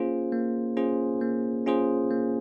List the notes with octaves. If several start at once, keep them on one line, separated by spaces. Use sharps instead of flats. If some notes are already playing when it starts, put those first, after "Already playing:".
Already playing: A#3 C#4 F4 G#4 C5
A#3
C#4 F4 G#4 C5
A#3
C#4 F4 G#4 C5
A#3